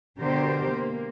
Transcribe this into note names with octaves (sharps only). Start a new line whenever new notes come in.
B2 D3 G4 A#4 C5
A#3